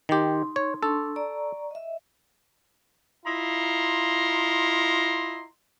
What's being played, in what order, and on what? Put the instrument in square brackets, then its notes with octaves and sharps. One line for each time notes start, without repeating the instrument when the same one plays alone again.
[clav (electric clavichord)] D#3 G4 [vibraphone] D#4 C6
[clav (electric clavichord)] C#5
[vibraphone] D4 C6 C#6 [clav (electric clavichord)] A4
[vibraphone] D5 A#5 C#6
D#5 E5
[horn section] E4 F4 D#5 A#5 C6